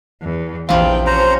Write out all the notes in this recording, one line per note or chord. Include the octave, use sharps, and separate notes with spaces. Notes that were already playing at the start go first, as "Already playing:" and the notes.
E2
A#1 E2 C3 E3 F3 F5 G5
C#4 C5 A#5